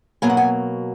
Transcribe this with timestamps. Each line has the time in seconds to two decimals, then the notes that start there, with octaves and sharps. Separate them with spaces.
0.22 B2 F#3 A#3 G#5
0.30 F#5
0.37 G#5